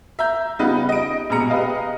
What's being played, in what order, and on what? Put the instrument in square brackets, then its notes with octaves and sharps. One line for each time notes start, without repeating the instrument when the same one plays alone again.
[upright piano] E5 A#5 G6
C#3 G3 B3 D#4 F4
D#5 D7
A#1 B2 G#3 A#5 C#7
G4 B4 D#5 F5